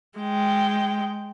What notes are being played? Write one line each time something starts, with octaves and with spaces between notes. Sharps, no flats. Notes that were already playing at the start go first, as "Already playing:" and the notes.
G#3 G5